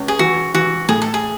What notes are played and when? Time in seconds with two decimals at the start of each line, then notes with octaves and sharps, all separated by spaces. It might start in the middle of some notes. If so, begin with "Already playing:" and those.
Already playing: C#2 C#4
0.08 G#4
0.19 E3 F#4
0.54 E3 F#4
0.89 A2 G#4
1.02 A4
1.14 G#4